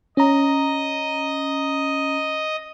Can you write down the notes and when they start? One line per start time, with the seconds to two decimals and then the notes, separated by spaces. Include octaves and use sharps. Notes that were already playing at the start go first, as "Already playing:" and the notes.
0.17 C#4 D#5 A#5